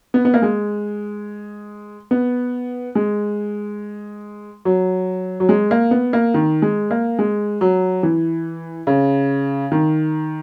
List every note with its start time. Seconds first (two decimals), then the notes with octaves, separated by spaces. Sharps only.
0.14 B3
0.25 B3
0.34 A#3
0.42 G#3
2.11 B3
2.95 G#3
4.65 F#3
5.40 F#3
5.49 G#3
5.71 A#3
5.91 B3
6.13 A#3
6.34 D#3
6.62 G#3
6.91 A#3
7.19 G#3
7.61 F#3
8.03 E3
8.87 C#3
9.72 D#3